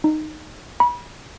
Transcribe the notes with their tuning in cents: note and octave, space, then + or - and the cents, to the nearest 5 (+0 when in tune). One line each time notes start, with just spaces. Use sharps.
D#4 -10
B5 -30